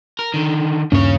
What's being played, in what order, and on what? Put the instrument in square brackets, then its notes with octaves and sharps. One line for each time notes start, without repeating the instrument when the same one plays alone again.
[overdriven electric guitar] A#4
D3 D#3
[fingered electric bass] D#1 G2 C#4 [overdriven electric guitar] C#3 C#5